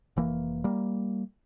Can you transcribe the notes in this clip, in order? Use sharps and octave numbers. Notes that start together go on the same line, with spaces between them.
F1 E3 A#3
G3 A#3